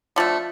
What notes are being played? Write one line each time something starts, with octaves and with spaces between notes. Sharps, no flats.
D3 F3 A3